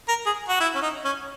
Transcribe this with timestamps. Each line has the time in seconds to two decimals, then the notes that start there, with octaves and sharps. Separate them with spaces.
0.08 A#4
0.26 G#4
0.49 F#4
0.60 E4
0.75 C#4
0.82 D#4
1.05 C#4